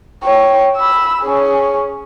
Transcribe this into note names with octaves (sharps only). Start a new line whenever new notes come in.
C#5 G5
B5 E6
C#4 G#4